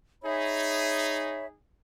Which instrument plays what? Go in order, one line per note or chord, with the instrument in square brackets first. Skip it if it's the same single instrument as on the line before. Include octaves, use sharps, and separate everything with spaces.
[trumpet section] D#4 G#4 [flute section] C#5 E5 B5